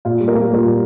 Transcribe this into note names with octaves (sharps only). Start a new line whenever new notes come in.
A#2 F4
G3
A#4
A#3 G4
G3 F4 A#4
A#2